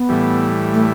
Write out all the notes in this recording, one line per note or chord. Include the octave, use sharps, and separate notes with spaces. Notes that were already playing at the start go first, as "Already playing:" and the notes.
Already playing: B3
A2 E3 G3
A3